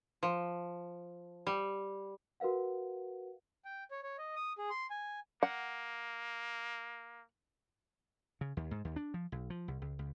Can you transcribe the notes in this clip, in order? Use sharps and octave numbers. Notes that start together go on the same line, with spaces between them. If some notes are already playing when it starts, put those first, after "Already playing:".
F3
G3
F#4 A#4 B4 F5 F#5
G5
C#5
C#5
D#5
D#6
G#4
C6
G#5
A#3 F#5
C#3
D#2
G#2
D#2
D4
F3
B1
F3
C2
C#2
C#2